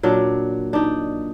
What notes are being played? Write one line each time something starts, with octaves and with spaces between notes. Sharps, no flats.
A#2 F#3 D4
D4 D#4